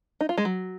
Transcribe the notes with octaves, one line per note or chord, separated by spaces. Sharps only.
D#4
F4
G#3
F#3